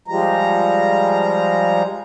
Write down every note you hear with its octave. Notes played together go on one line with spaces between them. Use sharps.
F3 G3 G#3 A#5